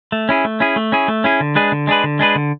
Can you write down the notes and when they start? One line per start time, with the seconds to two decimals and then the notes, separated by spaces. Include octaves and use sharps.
0.12 A3
0.29 C#4 E4 G#4
0.45 A3
0.60 C#4 E4 G#4
0.76 A3
0.92 C#4 E4 G#4
1.08 A3
1.24 C#4 E4 G#4
1.40 D3
1.55 G#3 D4 G#4 B4
1.72 D3
1.87 G#3 D4 G#4 B4
2.04 D3
2.19 G#3 D4 G#4 B4
2.35 D3